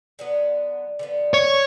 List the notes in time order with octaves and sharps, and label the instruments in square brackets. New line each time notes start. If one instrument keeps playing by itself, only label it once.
[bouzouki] D3 F#3 B3
D3 F3 B3
[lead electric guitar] C#5